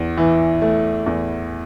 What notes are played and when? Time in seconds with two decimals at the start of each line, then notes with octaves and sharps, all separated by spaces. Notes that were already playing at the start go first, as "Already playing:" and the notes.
Already playing: E2
0.17 E3
0.62 A3
1.06 E2